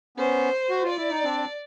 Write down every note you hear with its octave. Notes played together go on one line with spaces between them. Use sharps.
B3 C#4 C5
F#4
F4
D5
E4
D#4
C4 D4